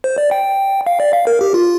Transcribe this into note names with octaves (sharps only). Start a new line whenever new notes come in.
C5
D5
G5
F5
D5
F5
A#4
G4
F4